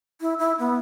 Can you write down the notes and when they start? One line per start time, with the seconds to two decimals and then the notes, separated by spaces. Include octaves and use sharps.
0.21 E4
0.39 E4
0.59 B3